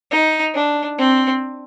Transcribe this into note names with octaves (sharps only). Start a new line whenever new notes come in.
D#4
D4
C4